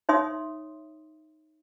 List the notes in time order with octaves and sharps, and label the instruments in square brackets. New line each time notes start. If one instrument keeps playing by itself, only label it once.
[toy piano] D#4 C#5 E5 C6 D#6